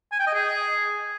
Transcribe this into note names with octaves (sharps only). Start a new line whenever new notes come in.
G#5
G5
D#5
G#4